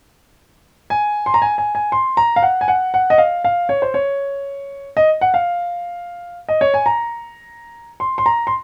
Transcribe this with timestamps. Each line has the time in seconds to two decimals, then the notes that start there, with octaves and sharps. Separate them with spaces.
0.90 G#5
1.26 C6
1.34 A#5
1.42 G#5
1.58 G#5
1.75 G#5
1.92 C6
2.17 A#5
2.36 F5
2.43 F#5
2.61 G#5
2.68 F#5
2.94 F#5
3.10 D#5
3.18 F5
3.45 F5
3.69 C#5
3.82 C5
3.94 C#5
4.97 D#5
5.21 F#5
5.34 F5
6.49 D#5
6.61 C#5
6.74 G#5
6.86 A#5
8.00 C6
8.18 C6
8.26 A#5
8.47 C6